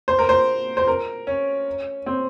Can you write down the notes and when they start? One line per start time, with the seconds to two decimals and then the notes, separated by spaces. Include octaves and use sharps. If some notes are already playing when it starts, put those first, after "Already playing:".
0.08 C5
0.19 A#4
0.29 C5
0.77 C5
0.88 A#4
1.27 C#4
2.06 C4